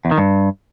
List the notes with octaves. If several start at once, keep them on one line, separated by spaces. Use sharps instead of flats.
E2
D#3
G2